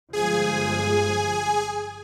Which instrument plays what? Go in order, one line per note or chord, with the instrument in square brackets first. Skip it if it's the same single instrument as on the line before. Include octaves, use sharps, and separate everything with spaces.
[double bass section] G1 F3 G#3 [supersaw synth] G#4 G#5